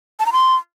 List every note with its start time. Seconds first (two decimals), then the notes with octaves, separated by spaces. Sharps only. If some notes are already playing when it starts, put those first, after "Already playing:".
0.20 A5
0.26 A#5
0.33 C6